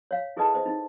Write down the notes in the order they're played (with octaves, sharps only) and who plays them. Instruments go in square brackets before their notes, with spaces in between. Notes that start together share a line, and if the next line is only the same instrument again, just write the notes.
[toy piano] C#5 F5
E4 G#4 A4 B4 D#5 A5
C5 D#5
D#4